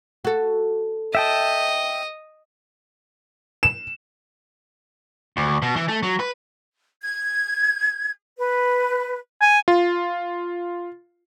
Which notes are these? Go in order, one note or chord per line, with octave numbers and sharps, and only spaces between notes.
F#4 A4
D#5 E5 G5 A5
E7
D2
B2
E3
A3
F#3
B4
G#6
B4
G#5
F4